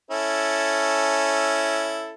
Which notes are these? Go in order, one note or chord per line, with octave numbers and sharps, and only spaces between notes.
C#4 E4 A4